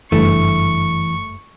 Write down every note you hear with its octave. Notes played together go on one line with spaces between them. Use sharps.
F#1 G2 E3 A3 C#6